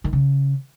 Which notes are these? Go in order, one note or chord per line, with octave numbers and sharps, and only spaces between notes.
D#3
C#3